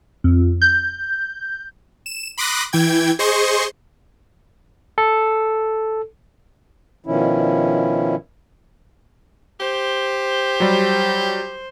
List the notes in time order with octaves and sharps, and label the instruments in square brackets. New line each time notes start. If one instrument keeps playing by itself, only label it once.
[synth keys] F2
G6
[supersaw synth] E7
B5 C6 D6 D#6 F#6 A#6
E3 G5 G#6
G#4 C5 D#5 C6 C#6
[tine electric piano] A4
[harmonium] B2 D#3 F3 C#4 E4
[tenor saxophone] G4 [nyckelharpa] C5
[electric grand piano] F#3 G3